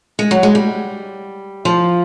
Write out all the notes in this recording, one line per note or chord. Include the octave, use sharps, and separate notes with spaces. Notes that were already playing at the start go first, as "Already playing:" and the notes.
G#3
F#3
G#3
G3
F3